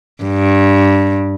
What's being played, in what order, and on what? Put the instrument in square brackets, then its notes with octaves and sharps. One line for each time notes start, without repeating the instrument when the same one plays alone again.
[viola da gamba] G2